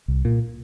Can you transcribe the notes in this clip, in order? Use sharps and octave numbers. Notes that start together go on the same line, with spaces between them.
C2
A#2